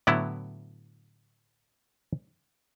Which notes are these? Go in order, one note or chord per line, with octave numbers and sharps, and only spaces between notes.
A2 D3 F#3 B3 E4